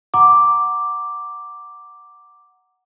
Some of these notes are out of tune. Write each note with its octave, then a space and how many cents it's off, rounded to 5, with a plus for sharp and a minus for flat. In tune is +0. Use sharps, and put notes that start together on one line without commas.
F#5 +0 A#5 +0 D6 +0